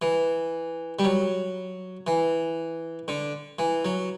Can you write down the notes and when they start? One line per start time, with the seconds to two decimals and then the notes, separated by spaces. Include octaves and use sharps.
0.02 E3
0.99 G3
1.04 F#3
2.07 E3
3.08 D3
3.59 E3
3.85 F#3